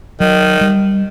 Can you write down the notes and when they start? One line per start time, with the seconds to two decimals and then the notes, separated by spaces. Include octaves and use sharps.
0.20 D#3 F#3
0.61 G3